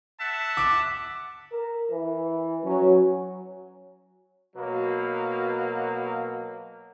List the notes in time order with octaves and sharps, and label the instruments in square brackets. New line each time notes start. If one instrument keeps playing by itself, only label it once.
[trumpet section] E5 F#5 A5
[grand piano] D6
[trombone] A#4
E3
[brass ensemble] F#3 [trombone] C#4
[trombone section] B2 F#3 A#3